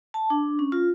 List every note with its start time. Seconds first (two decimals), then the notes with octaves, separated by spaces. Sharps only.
0.14 A5
0.30 D4
0.59 C#4
0.72 F4